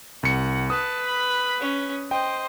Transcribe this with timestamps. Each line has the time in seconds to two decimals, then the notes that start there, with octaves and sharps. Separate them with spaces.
0.23 C2 F#5 C#7
0.70 B4 A5 D#6
1.06 B5
1.61 C#4 C#5
2.11 C5 D#5 G5